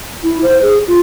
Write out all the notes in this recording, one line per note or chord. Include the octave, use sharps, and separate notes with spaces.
E4
C5
G#4
F4